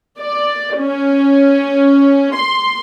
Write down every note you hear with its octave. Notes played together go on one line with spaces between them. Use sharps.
D5
C#4
C6